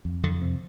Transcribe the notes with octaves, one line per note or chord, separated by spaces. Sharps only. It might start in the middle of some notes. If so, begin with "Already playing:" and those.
F2
F2 D3
C3